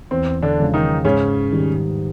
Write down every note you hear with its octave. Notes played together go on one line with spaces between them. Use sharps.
E2 C4
D3 D4
C#3 F3 G#3
D#3 D#4
G#2 C#3 C#4
D#3 G3